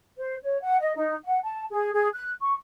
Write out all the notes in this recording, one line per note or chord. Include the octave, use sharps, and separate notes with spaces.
C5
C#5
F#5
D#5
D#4
F#5
A5
G#4
G#4
F#6
C#6